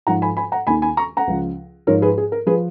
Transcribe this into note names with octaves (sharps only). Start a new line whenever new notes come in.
G#2 F3 F#5 A#5
G#5 B5
G#5 B5
F#5 A#5
D#2 D#3 G#5 B5
G#5 B5
A#5 C#6
F#5 A#5
C#2 C#3 F3
G#2 F3 A#4 C#5
G#4 B4
G#4
A#4
F3 G#4 B4